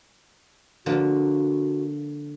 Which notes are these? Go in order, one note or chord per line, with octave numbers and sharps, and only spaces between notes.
D3 F3 A#3 F#4